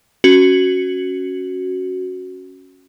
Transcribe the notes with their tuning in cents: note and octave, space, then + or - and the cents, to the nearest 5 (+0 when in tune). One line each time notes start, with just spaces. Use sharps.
C#4 -5 F#4 +0